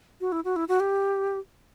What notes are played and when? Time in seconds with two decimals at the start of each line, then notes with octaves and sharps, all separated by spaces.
0.21 F#4
0.32 E4
0.45 F#4
0.56 E4
0.68 F#4
0.80 G4